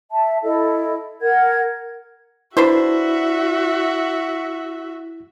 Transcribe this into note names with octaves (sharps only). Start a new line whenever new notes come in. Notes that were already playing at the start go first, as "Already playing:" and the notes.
E5 A5
E4 A4 D#5
A#4 F#5 G#6
D4 E4 F#4 B4 C5 E5